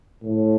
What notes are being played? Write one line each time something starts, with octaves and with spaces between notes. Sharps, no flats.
A2